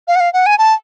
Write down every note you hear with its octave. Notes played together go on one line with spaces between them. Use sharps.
F5
F#5
F5
F#5
G#5
A5